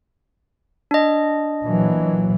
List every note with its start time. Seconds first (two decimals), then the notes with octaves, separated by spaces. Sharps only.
0.91 D4 D#5
1.64 A#2 E3 F#3